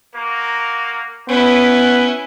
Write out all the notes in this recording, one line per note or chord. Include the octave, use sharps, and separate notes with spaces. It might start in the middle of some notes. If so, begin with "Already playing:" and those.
A#3 F#4 A#4
B3 C#4 E4 B4